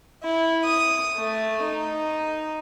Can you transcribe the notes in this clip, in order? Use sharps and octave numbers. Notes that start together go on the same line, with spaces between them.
E4
D#6
A3
D#4